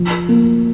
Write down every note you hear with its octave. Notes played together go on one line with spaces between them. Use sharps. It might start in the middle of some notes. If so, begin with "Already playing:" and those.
Already playing: F3
A#3